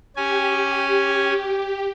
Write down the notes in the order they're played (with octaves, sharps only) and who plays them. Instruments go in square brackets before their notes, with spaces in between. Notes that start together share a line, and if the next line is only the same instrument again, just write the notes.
[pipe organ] C#4 G#5 [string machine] G4